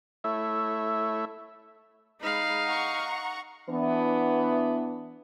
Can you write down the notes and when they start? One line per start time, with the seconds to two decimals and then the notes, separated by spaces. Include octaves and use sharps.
0.24 A3 E4 C#5 E5
2.21 G#3 D#4 F5 B5
2.65 F#5 A#5 C#6
3.70 E3 B3 D4